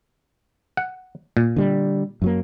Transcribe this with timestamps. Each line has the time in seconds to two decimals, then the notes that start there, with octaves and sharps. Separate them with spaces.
0.77 F#5
1.37 A#2
1.56 D3 G3
2.22 F#2 F#3 A#3